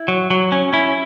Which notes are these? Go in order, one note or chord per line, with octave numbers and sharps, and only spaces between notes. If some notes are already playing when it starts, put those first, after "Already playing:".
Already playing: E4
F#3
F#3
C#4
C#4 E4